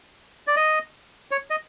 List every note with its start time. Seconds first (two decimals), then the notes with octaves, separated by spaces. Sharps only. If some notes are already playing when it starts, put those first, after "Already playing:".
0.47 D5
0.56 D#5
1.31 C#5
1.50 D#5